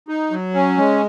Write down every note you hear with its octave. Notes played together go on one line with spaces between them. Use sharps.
D#4
F#3
C#4
G#3